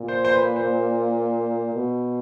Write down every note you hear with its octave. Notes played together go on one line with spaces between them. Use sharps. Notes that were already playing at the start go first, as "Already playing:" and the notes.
Already playing: A#2
C5
C5
B4
C5
B2